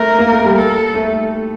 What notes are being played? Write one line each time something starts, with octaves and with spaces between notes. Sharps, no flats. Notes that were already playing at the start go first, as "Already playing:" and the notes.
Already playing: A3 A#4
A#3
A3
G3
A4
A3